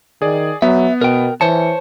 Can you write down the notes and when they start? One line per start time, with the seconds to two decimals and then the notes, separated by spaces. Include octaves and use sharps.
0.22 D#3 G#4 D5
0.62 F#3 B3 E5
1.01 B2 A#4 G5
1.41 E3 C5 C#5 A5 C#7